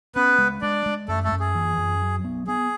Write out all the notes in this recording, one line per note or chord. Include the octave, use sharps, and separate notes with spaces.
B3 C#4 B4
G#3
G#3 D4 D5
G#3
F#2 A3 A4
A3 A4
F#2
G#4
E3
F#2
F#3
B3
B3 G#4